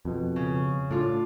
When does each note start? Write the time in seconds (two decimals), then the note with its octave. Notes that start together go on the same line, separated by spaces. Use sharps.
0.05 F2 B2
0.36 C#3
0.91 A2 D4 F4